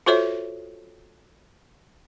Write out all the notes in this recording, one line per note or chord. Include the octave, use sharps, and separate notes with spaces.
F4 F#4 A4 C5 C#5 E5